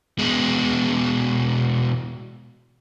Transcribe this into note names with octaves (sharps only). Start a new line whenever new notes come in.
B2 G#3